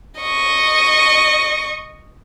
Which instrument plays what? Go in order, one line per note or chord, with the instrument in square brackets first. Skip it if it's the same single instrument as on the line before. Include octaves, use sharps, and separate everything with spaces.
[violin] D#5 C#6